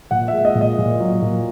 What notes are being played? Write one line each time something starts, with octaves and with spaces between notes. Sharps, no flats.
A#2 F#5
G#3 E5
D#5
A#2
D#5
A#2
F#3
A#2